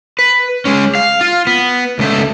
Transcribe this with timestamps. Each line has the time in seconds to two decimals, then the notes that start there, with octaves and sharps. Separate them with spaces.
0.19 B4
0.65 G#3 C#4
0.95 F5
1.21 F4
1.47 B3
1.99 C#2 A3